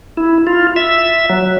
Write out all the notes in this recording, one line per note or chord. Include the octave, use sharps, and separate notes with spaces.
E4
F4
E5
F#3